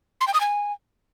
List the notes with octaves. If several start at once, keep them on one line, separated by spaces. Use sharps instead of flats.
C6
G5
D#6
G#5